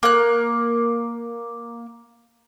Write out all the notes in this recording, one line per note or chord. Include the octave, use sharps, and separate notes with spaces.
A#3 F#6